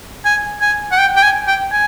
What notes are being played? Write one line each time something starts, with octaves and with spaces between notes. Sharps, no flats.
G#5
G#5
F#5
G5
G5
G#5
G5
G#5